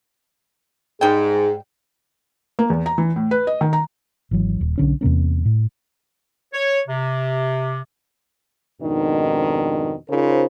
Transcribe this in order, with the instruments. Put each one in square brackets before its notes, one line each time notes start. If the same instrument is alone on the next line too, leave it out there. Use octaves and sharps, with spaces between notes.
[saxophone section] G#2 [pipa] G3 G5 [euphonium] G#4
[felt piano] A#3
E2
A#5
E3
A2
B4
D#5
D#3
A#5
[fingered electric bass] G#1 E3 F#3
D#1
B1 D3 C#4
E2 C3 A#3 C#4
A2
[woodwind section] C#5
C3
[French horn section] F2 G#2 B2 D#3 D4 D#4
C#3 D#4 F4 A#4 C5